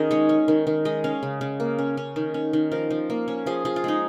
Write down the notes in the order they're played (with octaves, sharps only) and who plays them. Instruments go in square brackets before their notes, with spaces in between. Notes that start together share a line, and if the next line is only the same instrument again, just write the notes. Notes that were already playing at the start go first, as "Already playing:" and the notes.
Already playing: [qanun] D#3 C#4 D#4 F4 G#4 A#4 D#5
G#3 C#5
C#4
D#3
D#3
G#3 D#5
C#4 F5
C#3
C#3
A#3
C#4
C#4
D#3
C#4
D#3
F3 A#4
F3
A#3
C#4
F3 G#4
F3 G#4
F4
G#3 D#4